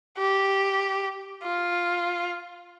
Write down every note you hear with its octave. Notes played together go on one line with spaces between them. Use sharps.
G4
F4